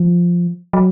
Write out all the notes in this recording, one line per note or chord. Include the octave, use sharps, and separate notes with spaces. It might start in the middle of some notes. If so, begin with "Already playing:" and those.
Already playing: F3
F#3